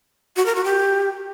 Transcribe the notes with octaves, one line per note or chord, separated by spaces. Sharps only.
F#4
A#4
F#4
G4